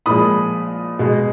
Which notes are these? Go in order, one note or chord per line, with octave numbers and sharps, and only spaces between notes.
A#2 F3 G#3 B5 D#6
B2 G#3